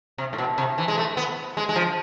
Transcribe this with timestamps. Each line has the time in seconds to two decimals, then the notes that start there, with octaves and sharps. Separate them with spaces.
0.18 C3
0.33 A2
0.38 B2
0.58 C3
0.78 E3
0.88 G#3
0.98 A3
1.17 B3
1.57 G#3
1.69 G#3
1.76 F3